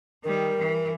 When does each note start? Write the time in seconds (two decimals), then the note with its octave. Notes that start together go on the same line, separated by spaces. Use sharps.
0.24 D#3 G3 A#4
0.58 E3